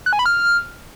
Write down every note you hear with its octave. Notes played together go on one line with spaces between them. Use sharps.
F#6
G#5
B5
F6